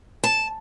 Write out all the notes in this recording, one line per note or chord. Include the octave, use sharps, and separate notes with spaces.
A5